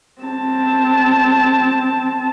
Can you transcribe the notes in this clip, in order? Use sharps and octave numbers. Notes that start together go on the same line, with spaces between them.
C4 A5